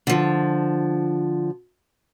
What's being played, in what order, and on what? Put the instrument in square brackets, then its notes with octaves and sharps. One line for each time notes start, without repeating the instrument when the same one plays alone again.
[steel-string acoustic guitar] D3 F3